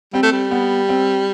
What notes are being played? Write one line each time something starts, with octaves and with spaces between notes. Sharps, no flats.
G3 C4
A3
G3
B3
C4